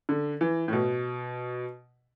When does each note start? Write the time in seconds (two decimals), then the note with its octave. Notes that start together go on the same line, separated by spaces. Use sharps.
0.09 D3
0.41 E3
0.68 A2
0.73 B2